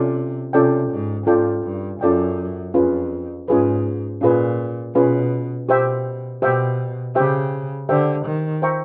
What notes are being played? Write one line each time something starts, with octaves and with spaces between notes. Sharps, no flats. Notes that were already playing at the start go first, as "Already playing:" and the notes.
Already playing: C3 C#4 F4 A4 D5
C3 C#4 F4 A4 D5 G5
G#2
G#2 C#4 F4 A4 D5 G5
G2
F#2 C#4 F4 A4 D5 G5
F2 C#4 F4 G#4 B4
G#2 C#4 F4 G#4 B4
A#2 C#4 F4 G#4 B4
B2 C#4 F4 G#4 B4
B2 G4 C5 E5 G5
B2 G4 C5 E5 G5
C#3 G4 C5 E5 G5
D3 G4 C5 E5 G5
D#3
C5 E5 G5 A#5 C#6